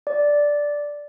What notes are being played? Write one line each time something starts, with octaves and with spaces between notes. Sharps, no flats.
D5